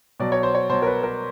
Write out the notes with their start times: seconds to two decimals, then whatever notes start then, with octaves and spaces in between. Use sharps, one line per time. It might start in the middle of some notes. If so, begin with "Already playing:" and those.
0.20 B2 F#3 D5
0.32 C#5
0.43 C5
0.55 C#5
0.69 B2 F#3 C5
0.82 A#4
0.87 B4
1.03 A#4